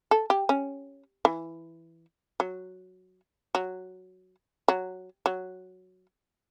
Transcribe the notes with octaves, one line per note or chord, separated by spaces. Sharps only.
A4
G4
C#4
E3
F#3
F#3
F#3
F#3